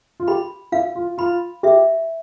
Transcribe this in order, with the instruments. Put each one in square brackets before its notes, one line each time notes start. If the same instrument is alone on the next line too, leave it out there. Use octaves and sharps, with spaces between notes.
[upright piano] F4
[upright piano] G4 [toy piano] B5
[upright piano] E4 [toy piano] F5
[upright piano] F4
[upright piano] F4 [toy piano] B5
[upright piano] G4 [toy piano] E5